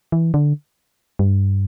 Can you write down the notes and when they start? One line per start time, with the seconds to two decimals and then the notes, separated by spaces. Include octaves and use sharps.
0.12 E3
0.34 D3
1.19 G2